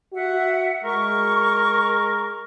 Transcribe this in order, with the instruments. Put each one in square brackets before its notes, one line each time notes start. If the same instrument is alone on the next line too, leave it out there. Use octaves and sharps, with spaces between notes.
[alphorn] F#4 [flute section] E5 F#5
[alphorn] G#3 [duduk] A#4 [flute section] C#6